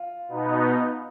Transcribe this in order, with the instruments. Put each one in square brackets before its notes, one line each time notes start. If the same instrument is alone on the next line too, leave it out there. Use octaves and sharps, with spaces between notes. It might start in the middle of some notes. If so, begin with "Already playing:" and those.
Already playing: [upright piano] F4
[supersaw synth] B2 B3 D#4